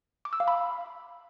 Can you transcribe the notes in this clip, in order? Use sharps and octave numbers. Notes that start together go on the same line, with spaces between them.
D6
E6
F5
B5